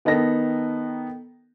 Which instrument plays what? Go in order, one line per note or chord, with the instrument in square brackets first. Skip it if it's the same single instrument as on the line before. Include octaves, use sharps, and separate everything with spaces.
[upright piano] D#3 B3 D#4 A4 A#6